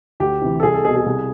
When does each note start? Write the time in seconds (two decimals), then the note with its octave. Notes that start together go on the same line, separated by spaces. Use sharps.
0.20 D2 G4
0.41 C3 E3
0.60 A4
0.63 C2 G#4
0.74 A4
0.84 B2 G#4
0.96 G#4
1.06 C2